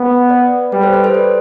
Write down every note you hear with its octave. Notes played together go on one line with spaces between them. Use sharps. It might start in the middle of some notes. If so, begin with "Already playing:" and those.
Already playing: B3
B4 D5
G3 B4
A4 C5
B4 D5
A4 C5
B4